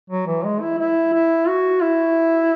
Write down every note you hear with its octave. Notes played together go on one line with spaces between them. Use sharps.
F#3
E3
G#3
E4
E4
E4
F#4
E4